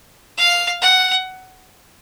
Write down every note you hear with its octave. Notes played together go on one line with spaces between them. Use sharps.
F5
F#5